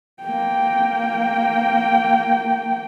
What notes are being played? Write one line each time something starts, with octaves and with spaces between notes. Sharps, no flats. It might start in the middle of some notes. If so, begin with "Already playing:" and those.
A#3 G5